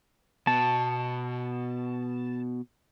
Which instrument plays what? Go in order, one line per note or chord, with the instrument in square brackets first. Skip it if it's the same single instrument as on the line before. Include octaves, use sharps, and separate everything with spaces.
[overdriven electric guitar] B2 [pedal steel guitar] A5